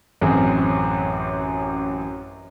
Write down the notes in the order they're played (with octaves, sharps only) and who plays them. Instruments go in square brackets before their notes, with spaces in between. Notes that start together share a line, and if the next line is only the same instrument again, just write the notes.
[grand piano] A1 F#2 C4 G#4